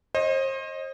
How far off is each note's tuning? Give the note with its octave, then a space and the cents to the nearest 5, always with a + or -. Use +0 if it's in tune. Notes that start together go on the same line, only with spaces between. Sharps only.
C5 +40 D#5 +0